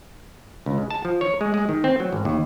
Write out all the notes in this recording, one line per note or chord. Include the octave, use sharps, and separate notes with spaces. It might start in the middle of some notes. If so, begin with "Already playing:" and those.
C#2
G#3
A5
F3
C#5
G#3
G#3
D#3
C4
F#3
G#1
D#2